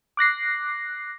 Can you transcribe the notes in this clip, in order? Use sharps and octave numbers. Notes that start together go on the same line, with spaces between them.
D6 F#6 A#6 C7